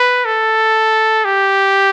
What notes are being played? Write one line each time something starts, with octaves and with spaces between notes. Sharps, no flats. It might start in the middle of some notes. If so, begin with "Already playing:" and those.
Already playing: B4
A4
G4